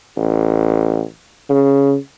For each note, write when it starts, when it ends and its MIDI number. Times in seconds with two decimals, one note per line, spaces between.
0.16 1.01 33
1.50 1.95 49